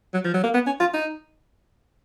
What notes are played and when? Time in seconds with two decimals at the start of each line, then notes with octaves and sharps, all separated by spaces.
0.14 F#3
0.25 F3
0.34 F#3
0.44 A#3
0.54 B3
0.67 C#4
0.80 F4
0.94 D#4